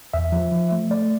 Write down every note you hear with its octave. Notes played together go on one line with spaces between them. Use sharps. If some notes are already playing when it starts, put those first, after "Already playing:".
E2 E5
F3
F3
A3
A3 D5